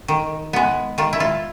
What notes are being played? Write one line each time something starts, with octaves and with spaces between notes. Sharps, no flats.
D#3
G#3 B3
D#3 F4
E4
F4